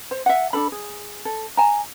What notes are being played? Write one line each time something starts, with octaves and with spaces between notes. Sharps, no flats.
C5
E5 F#5
D4 F4 A4 B5
G#4
A4
G#5 A#5